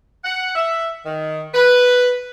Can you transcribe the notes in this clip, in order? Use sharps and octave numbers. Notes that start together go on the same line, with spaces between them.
F#5
E5
D#3
B4